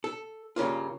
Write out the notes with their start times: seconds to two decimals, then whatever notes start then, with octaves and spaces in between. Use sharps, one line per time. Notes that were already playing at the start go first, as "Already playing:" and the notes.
0.04 A4
0.56 G2 C#3 A#3 F4